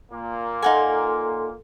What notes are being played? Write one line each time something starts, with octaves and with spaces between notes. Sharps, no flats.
A#2 A#3
D#4 A4 F#5 G#5 C6